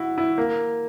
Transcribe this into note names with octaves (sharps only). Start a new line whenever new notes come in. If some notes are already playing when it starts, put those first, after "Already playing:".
Already playing: E4 F#4
E4
A#3